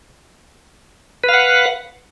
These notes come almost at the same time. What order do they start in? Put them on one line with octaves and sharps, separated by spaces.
B4 F5 F#5